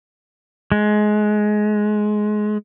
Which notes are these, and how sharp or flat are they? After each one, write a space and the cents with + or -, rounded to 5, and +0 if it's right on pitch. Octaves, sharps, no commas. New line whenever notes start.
G#3 +20